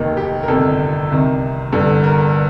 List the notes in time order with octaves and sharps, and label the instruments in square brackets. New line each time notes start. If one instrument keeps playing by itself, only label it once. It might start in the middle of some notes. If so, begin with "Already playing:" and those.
Already playing: [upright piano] F1 D#2 D#3
G4
A#4
G1 F2 C3 D#3 A4
C2 C3 D#3
G1 G2 D3 A4
A#4